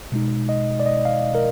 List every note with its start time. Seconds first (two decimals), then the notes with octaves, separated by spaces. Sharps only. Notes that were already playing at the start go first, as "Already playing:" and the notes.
0.12 B2 G#3 D#4
0.49 D#5
0.80 D5
0.86 D#5
1.05 F5
1.35 A#4